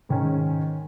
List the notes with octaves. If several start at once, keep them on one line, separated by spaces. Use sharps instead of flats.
G#2 D#3 C#4